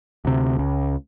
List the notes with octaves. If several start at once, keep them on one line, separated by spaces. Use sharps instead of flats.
D2 C3
C#2 C#3